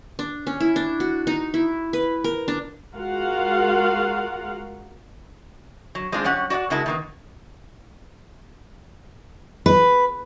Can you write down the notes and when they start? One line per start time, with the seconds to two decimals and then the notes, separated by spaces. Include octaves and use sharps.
0.19 D4
0.47 C#4
0.60 E4
0.76 D4
1.00 F#4
1.27 D#4
1.54 E4
1.93 B4
2.24 A#4
2.48 D4
2.93 G#3 F4 F#4 A#4 F5 F#5
5.95 F#3
6.12 G#3 C4 D4 F4 G#4
6.24 F#2 G3 C#4 F#5
6.50 F#4 D5 D#5 F#5
6.70 C#3 G#3 E4 F#4 A#4 A5
6.86 D#3 A#3 B3
9.66 B4